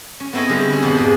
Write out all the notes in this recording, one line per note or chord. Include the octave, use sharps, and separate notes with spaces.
C#4
B3 C4 E4 A4 C#5 D#5
D3 G3 G#3
C#4 E4
F2 B2 B5
G#2 G#4 B4 D5